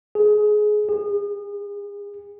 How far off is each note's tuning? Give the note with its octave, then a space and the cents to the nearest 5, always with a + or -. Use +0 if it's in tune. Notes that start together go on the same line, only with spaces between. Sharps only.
G#4 +20
G#4 -35